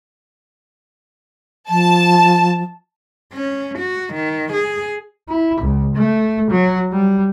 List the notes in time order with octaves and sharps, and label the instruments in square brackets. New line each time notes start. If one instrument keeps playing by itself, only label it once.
[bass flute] F3 [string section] A5
[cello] C#4
F#4
D#3
G#4
[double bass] E4
C#2
A3
F#3
G3